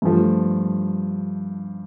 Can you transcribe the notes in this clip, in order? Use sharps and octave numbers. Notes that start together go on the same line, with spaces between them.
G2 F3 A3